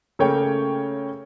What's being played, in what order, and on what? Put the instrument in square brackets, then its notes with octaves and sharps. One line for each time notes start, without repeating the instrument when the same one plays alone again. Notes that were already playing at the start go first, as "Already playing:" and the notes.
[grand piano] C#3 A3 A#3 C#5 G5